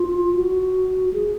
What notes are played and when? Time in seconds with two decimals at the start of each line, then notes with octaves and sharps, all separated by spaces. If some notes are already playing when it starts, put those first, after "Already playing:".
Already playing: F4
0.36 F#4
1.13 G#4